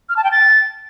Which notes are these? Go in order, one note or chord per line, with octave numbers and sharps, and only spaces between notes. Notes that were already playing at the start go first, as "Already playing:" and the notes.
F6
A5
G5
A6